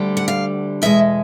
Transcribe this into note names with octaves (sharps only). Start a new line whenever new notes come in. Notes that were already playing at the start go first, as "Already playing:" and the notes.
Already playing: D2 D3 G3
F#5
F5
E2 B2 G#3 E5